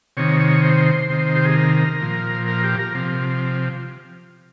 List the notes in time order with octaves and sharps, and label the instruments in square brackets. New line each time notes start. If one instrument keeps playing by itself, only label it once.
[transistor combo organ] C3 D#3 C#5
C#5
C5
C3 D#3
G4
G#4
A#4
A#2 F3
A#4
G4
A#4
C3 F3